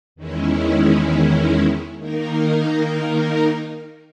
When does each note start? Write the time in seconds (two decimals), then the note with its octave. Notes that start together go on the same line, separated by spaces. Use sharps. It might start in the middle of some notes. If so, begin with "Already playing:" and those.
0.16 E2 D#3 G#3 C#4 E4
1.99 D#3 A#3 D#4 A#4